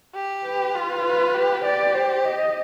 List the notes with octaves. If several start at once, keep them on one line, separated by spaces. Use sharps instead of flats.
G4
B4
F4
B4
G4
G4 D5
C5
D#5